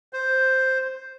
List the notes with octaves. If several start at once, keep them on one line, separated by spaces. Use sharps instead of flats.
C5